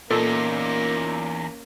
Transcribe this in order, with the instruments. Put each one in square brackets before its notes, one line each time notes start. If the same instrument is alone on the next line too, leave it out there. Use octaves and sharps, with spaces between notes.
[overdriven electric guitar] E2 D#4 [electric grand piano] A#2 [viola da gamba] A#3 C#4 [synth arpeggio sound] A4